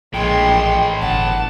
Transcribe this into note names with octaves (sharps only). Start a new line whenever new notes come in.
A#1 A2 E3 G#3 G5 C6
G1 F#5 A5